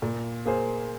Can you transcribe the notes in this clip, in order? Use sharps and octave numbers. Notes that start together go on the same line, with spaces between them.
A#2
A#3 G#4 C5